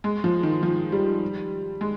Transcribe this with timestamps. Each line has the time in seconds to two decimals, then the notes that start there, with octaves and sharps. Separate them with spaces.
0.04 G#3
0.24 F3
0.43 D#3
0.63 F3
0.92 G3
1.81 G#3